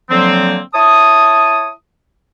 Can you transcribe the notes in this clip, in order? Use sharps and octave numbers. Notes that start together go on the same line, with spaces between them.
D3 F3 F#3 A#3 C4
E4 C#5 A5 D#6